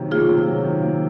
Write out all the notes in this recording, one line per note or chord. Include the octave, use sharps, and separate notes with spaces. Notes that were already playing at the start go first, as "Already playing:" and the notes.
Already playing: C3 D#3 F#3 A#3
A#3 F4 G#4
C3
F#3
D#3
A#3